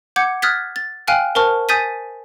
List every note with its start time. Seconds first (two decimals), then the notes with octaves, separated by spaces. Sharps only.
0.16 F#5 D6 G6 G#6 C#7
0.42 D#6 F6 F#6 G#6 A6 B6
0.76 A6
1.08 F5 G5 G#5 F6 F#6
1.35 A#4 C5 A5 C#6 F6
1.69 G#5 D#6 G6 A6 B6 D#7